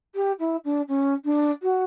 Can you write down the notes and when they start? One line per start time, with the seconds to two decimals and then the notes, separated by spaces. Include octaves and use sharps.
0.15 G4
0.39 E4
0.64 D4
0.88 C#4
1.24 D4
1.62 F#4